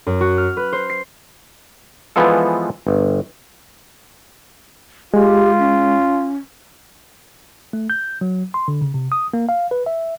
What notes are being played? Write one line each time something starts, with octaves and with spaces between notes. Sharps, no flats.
F#2
F#4
F6
B4
C5
C7
E3 F3 G#3 B3 F4 A4
G1
G#3 F4 G4
C#4
A3
G6
F#3
C6
D3
C#3
C3
D#6
A#3
F5
B4
E5